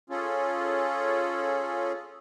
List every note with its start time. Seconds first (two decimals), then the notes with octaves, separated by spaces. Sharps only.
0.10 C#4 F4 G#4 A4